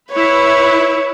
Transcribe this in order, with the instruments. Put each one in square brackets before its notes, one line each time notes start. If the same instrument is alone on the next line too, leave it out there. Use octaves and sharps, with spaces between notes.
[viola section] E4 B4 [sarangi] C#5